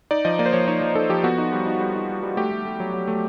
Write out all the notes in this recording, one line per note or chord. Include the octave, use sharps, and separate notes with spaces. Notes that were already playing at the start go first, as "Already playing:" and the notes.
D#4 D5
F3 D#5
A#3 D5
C5
F3 C#5
D#4 C#5
F3
D#4 A4
F3 G4
B3 F#4
D#4
G3
D#4
G3
D#4
G3
G3
A3 G4
A3
A3
F#3
F#3
A3